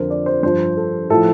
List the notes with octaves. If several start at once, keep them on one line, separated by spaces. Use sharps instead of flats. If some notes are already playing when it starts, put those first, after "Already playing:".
Already playing: F2 D3 F3 A#4 C5
D5
C5
G2 F3 C5
A4
A2 F3 A4